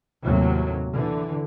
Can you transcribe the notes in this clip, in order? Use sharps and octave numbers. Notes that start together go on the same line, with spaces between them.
D#2 A2 C3 F#3
D3 E3